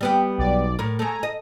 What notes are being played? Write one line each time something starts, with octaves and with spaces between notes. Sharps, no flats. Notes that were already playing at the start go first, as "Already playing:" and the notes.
G3 B3 G4
B1 D5
A2 A#4
G#3 A3 G#5 A#5
D#5